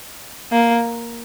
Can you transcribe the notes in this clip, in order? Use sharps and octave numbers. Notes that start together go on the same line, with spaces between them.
A#3